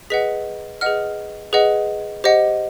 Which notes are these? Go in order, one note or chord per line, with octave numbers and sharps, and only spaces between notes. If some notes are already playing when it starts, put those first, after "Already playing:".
G#4 B4 D#5 F#5 B6
G#4 B4 D#5 F#5 F6
G#4 B4 D#5 F#5
G4 C5 D#5 F#5